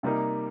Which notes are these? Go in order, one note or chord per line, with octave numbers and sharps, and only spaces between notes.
C3 G3 A#3 D#4